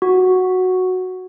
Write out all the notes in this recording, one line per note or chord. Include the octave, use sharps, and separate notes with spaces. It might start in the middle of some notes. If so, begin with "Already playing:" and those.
F#4